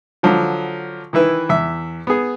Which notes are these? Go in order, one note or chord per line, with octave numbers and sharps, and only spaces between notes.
D3 F3 F#3
D#3 E3 E4 B4
E2 E5
B3 G#4